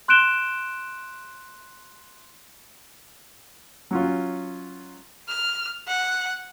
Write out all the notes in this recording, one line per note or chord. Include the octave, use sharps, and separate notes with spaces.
C6 F#6 G6 D7 E7 G7
F#3 C#4 F4
F6
F#5